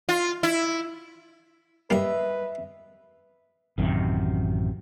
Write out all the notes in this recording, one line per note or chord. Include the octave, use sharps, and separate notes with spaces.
F4
E4
G3 A#3 B4 D#5 E5
A1 F#2 C3 D#3